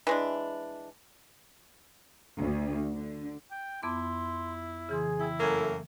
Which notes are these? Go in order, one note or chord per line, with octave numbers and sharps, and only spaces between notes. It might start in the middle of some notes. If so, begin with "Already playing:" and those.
E3 G#3 D4
D2
D3
G5
F2 B3 E4 C6 D6
C#3 E3 G#4 C6
E4 G5 E6
F#2 A3 A#3 A4 G#6